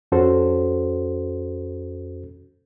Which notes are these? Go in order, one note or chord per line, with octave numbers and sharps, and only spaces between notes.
F2 C#4 F#4 A4 C5